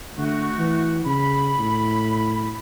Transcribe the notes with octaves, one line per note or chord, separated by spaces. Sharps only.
D3 A3 F#4
E3
C#3 B5
A2